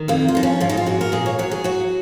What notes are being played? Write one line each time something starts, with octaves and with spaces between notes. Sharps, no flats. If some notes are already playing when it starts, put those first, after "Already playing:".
Already playing: D#3
F2 A#3
F4
F3 D#4
C#4
G#2 F4
D#4
F4
G#2 F#4
A#4
A#2 G#4
C#5
F#3 C#5
G#4
F#3 F#4